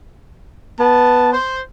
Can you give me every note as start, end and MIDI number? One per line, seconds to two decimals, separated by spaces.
0.80 1.34 59
0.80 1.31 81
1.33 1.61 72